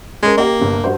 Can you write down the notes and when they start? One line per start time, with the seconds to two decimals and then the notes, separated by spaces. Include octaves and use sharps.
0.23 G#3 C#4 A#4
0.37 A#3 G4 D#5
0.59 G1 C3
0.84 G2 F#4 C5